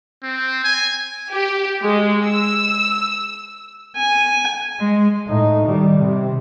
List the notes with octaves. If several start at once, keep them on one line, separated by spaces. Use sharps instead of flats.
C4
G#5
G4
G#3
E6
G#5
G#3
A2 D#4
D#3 G3
C3